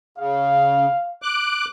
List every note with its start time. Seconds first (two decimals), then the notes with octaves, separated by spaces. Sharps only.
0.18 C#3 F5
1.22 D6 F#6